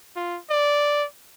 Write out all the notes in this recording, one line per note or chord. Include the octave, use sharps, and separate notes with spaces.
F4
D5